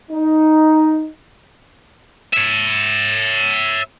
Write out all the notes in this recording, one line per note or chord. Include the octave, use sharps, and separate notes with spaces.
D#4
C#5 E5